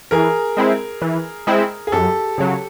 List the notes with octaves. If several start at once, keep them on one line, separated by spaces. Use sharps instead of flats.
E3 G#4 A#4
G#3 C4 E4
E3
G#3 C4 E4
G#4
F#2 G4 A4
C#3 F#3